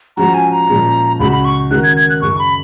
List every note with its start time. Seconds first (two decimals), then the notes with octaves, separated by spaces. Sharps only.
0.17 F3 G#3 C#4 F#4 A#5
0.34 G#5
0.51 A#5
0.68 A#2 F3 G#3 C#4
1.19 C#2 C#3 G#3 C#4 F#4 B5
1.32 B5
1.45 C#6
1.71 D#3 G#3 C#4 F#4 A#4 F#6
1.83 G#6
1.97 G#6
2.10 F#6
2.22 F#2 C#3 G#3 C#6
2.39 B5